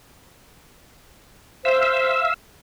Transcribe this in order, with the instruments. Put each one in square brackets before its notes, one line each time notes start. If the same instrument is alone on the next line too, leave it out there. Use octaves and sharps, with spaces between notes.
[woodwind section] C5 [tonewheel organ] E5 F5 E6